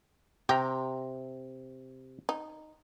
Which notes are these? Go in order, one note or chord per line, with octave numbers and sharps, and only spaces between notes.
C3 G4 A#5
D#4